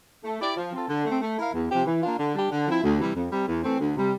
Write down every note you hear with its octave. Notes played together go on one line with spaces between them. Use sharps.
A3
E4 G4 D5
F3
C4 F4 A4
D3
A3 C4
A3
E4 A#4 F5
E2
C3 F3 C4 G4
E3
A#3 D4 F4
D3
G3 D4 G4
D3
F3 C4 E4
D2
C3 E3 G3
F2
C3 G3
E2
E3 A3 C4
D2
C3 G3